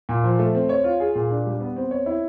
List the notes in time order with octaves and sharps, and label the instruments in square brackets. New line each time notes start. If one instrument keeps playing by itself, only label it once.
[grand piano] A#2
F3
A3
C4
C#5
F4
G#4
A#2
D4
G3
B3
C4
C#5
E4